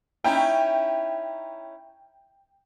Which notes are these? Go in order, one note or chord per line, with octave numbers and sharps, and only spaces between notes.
C#4 D#4 E4 G5